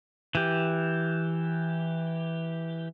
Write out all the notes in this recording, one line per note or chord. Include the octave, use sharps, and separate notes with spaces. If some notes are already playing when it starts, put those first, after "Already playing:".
E3 G4